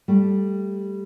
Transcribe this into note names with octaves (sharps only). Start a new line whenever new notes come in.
G3 A3